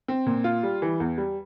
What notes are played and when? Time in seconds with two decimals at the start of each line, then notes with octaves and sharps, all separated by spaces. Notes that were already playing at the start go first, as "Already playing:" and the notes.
0.08 C4
0.26 A#2
0.44 F4
0.63 G3
0.82 E3
1.00 E2
1.18 G3